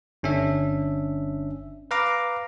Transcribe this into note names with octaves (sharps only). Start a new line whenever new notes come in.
G1 C#4 D4 E5
B4 F5 A#5 D6